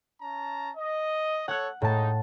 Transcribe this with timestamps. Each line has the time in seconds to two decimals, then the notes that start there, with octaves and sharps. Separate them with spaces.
0.21 C#4 A5 A#5
0.77 D#5
1.48 A4 C#5 F#5 F#6
1.82 A2 G#3 D#4 A5